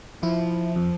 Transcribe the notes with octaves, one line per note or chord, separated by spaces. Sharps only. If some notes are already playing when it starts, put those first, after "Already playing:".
F3 E4
F2